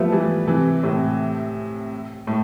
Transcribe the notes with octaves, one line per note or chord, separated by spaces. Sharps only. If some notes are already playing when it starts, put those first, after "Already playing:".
Already playing: F3 G3 A3 B3
E3 G3
C3 E3
A2 C3
A2